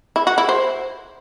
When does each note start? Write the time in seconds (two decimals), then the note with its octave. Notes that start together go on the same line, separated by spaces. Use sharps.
0.16 E4
0.27 F#4
0.38 E4
0.49 C5